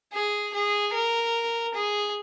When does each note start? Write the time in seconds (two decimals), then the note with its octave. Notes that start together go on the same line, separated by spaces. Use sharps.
0.13 G#4
0.53 G#4
0.93 A#4
1.74 G#4